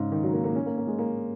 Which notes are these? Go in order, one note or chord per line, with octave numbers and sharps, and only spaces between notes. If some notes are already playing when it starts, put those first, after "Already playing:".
Already playing: G#2 C#3
D#3
F#3
A#3
A#3
C#4
A#3
A#3
G#3
A#3